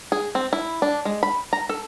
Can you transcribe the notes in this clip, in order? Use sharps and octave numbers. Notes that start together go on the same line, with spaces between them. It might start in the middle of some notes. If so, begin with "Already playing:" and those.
G#4
C4
E4
D4
G#3
B5
A#5
A4